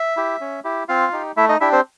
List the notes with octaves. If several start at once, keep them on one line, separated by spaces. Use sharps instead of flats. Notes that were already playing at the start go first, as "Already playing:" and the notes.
Already playing: E5
E4 G4
C#4
E4 G4
C4 F4 F5
D#4 G4
A3 E4 E5
D#4 D#5
D4 E4 G4 E5
C4 C5